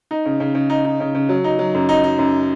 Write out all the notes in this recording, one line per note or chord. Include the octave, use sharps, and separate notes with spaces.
D#4
C#3
C#3
C#3
D#4
D#4
C#3
C#3
F#3
D#4
F#3
F#2
D#4
D#4
F#2